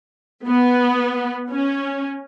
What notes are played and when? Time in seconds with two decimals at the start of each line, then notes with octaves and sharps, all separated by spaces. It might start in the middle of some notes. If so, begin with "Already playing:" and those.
0.46 B3
1.50 C#4